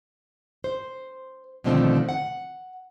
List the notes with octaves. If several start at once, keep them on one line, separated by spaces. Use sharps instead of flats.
C5
B2 D3 D#3 F3 A3 C4
F#5